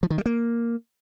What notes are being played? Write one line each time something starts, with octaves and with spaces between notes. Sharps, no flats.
F3
D#3
G3
A#3